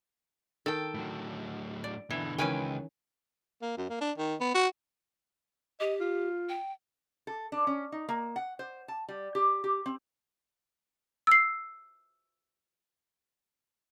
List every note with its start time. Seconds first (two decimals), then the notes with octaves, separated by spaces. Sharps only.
0.66 D#3 A4 G5
0.94 A2 F#3
1.84 D5
2.10 B2 D3 E3
2.38 C#2 D#3 E3 C#4 B4 G5 G#5
3.62 A#3
3.78 F#2
3.89 A#3
4.01 D4
4.18 D#3
4.41 B3
4.55 F#4
5.80 G4 D#5
6.00 F4
6.49 G5
7.27 A4
7.52 D4
7.67 C#4
7.92 D#4
8.09 A#3
8.36 F#5
8.59 C5
8.88 A5
9.08 G3
9.35 G4
9.64 G4
9.86 C4
11.27 E6 C7